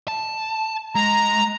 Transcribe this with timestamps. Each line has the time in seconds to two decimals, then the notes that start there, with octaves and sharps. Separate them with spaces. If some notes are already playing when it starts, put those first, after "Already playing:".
0.08 A5
0.95 G#3 A#5